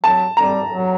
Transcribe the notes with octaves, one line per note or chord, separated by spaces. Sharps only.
F#3 A5
G3 A#5
F#3